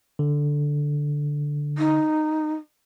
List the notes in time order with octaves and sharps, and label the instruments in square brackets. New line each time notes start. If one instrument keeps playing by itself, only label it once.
[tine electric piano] D3
[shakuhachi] D#4